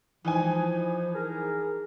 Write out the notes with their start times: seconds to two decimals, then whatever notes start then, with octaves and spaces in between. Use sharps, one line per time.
0.25 E3 F3 D#4 G#5
1.14 G#4 A#4